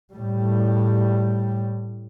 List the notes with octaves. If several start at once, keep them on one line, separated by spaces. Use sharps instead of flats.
A2 G3